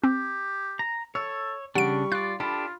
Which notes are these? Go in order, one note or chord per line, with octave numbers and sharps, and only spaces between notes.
C4 G4
A#5
A4 C#5 E6
C#3 G3 D4 F#5 C#6 D7
F4 D5 F#6
D4 F4 G4 A4 B5